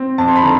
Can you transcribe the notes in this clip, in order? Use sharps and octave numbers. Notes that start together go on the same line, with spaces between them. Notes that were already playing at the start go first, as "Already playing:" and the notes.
Already playing: C4
F2 A5
C6
B5
D3 A#5